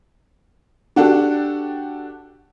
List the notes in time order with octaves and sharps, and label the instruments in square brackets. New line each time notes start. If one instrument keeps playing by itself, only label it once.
[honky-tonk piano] D4 F#4 G4 A4